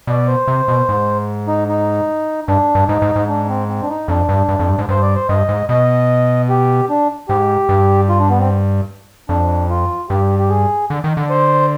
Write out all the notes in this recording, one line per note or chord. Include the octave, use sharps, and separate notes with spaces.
B2 D5
C5
C3
B2
G#2
D#4
D#4
G2 D4
G2
G#2 D#4
G#2
G#2
D4
C4
C4
D4
D#4
F2 D4
G2
G2
F2
G2
G#2
G2 C5
D5
C5
G2 D#5
G#2
B2 D#5
G4
D4
G#2 G4
G2
F4
D4
B3
C4
F2 D4
F4
G2 G4
G4
G#4
D3
D#3
D3
C5